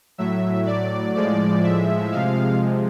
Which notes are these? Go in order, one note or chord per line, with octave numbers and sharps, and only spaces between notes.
A2 F#3 E5
D5
A2 F3 G#3 D5
E5
C3 F3 G#3 F5